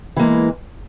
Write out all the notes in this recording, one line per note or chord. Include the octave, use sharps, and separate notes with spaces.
E3 G#3 A#3